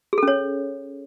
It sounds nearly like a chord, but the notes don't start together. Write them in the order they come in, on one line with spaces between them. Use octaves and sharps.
G#4 A4 C#4 C#5